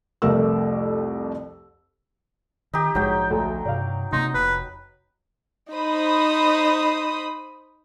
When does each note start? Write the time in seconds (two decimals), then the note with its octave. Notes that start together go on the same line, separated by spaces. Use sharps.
0.22 C2 F2 A3 A#4 E6
2.73 D#3 D#4 G4
2.95 A#1 G#2 F3 F#3 G5
3.30 D2 A3
3.65 G2 C3 D5 F5
4.12 C3 A3 A#3 D#4 C6 D#6
4.34 F1 B4
5.72 D#4 C5 B5 D#6